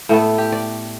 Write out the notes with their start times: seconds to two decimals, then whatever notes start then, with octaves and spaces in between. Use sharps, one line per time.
0.09 A2 A3 B3 A4
0.38 G4
0.52 D5